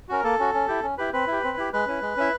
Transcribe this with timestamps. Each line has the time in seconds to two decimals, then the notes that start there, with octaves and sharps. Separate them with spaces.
0.09 C#4 F#4 A#4
0.23 A#3 A4
0.39 C#4 F#4
0.54 C#4
0.68 E4 G4
0.83 C#4
0.98 E4 G4 B4
1.13 C4 B4
1.27 E4 G4
1.43 C4
1.57 E4 G4
1.73 G#3 B4
1.87 C#4 E4
2.02 G#3
2.17 C#4 E4 E5